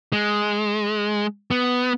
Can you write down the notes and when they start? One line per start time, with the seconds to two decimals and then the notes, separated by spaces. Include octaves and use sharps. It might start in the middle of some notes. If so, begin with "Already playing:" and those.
0.13 G#3
1.51 B3